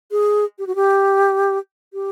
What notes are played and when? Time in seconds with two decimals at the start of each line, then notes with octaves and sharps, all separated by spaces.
0.11 G#4
0.59 G4
0.67 F#4
0.76 G4
1.94 G4